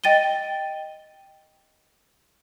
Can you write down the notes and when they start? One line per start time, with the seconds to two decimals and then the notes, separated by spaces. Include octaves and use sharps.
0.04 D#5 G5 A6 D#7 G7